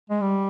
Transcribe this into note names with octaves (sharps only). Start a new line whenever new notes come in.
G#3
G3